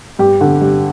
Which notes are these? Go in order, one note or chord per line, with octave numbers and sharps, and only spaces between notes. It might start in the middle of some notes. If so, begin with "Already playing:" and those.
G2 G4
D3
G2